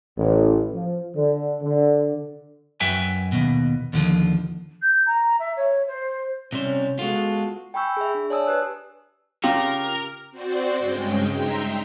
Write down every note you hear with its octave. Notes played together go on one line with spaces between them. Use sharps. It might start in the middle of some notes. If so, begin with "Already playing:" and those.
A1
F3
D3
D3
F#2 B4 E5 G5 G#5
D#2 B2
D#2 D3 F3
G6
A#5
E5
C#5
C5
C3 G3 C#4 C5
G#3 B3 F4 F#4 A4
G5 G#5 B5 C#6 E6 G6
G#4 E5
D4
C#5 D5 G#5 A5 D#6 E6
G4 B4 F#6
C#3 F4 G4 A#4
C4 F#4 C5 D5
G2 C#3 G#3 G5
D#4 E5 G5 A#5 C6